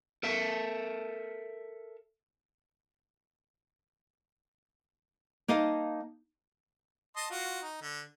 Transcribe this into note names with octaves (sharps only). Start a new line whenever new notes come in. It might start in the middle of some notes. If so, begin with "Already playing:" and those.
A4 A#4 E5
A#3 D#4 D#5 F5 A5
D#5 A5 C6
F4 F#4
D#4
D3